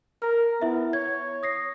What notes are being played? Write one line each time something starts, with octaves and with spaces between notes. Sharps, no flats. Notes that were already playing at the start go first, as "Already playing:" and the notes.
A#4 F6
B3 E4 E5
C#5 G#6
D#6 A#6 C7